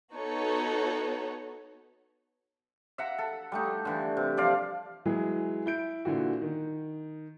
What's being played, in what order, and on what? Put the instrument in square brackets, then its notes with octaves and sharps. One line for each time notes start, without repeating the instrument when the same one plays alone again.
[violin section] B3 D#4 F#4 A4 C#5
[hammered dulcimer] E5 F#5 A#5
A4
G3 A3 D#4
D3 E3
C3
F3 D5 F5
[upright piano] E3 F#3 G#3 G#4
E4 G6 D7
A#2 D3 E3 F#4
D#3